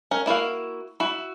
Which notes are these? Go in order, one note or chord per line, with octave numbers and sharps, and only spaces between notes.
C#4 A#4
A#3 E4 F#4 F5
E4 F#4